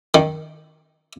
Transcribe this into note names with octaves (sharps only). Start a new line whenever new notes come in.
D#3